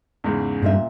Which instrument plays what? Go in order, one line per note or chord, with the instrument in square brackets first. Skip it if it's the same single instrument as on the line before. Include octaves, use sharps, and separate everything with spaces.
[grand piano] E2 G#2 C#3
[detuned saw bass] G2 [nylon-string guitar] A#2 F4 E5